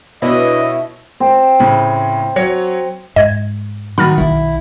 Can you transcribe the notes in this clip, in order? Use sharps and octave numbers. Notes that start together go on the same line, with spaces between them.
B2 D4 E4 B4 C#5 D#5 E5
C4
A2 C#3
F#3 C#5 C#7
G#2 D#5 G#6
D#3 F#3 D#4 B5 F6 A6
B1 D#3 E4